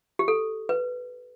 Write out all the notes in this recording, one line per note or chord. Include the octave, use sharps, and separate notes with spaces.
G4
A4
B4